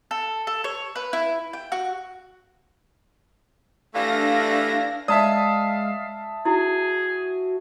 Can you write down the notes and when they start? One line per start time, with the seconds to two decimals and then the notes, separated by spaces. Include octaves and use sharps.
0.11 A4
0.47 A4
0.64 C#5
0.96 B4
1.13 E4
1.53 G5
1.72 F#4
3.95 E3 G3 A3 D4 F5 A#6
5.08 G#3 D5 E5 F5 A5 D#6
6.45 E4 F#4 G#4